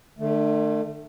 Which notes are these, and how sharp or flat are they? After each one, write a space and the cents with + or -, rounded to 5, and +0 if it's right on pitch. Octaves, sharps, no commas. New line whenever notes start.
D3 +45 A3 +0